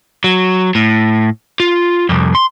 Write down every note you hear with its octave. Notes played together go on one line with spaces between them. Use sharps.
F#3
A2
F4
C2 F2
C6